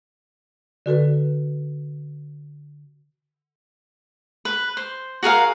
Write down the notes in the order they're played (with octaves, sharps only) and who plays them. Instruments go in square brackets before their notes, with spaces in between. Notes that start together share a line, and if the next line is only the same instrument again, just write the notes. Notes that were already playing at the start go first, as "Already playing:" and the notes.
[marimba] D3 F#4 A4 B4
[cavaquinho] B4
C5
F#4 G#4 A#4 F5